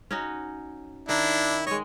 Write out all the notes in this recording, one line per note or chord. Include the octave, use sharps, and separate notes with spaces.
C#4 D#4 F#4
D#3 D4 E4
G#3 C#5 D#5